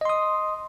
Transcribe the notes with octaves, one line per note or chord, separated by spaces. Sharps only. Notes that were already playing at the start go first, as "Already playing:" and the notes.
D#5 C6 D#6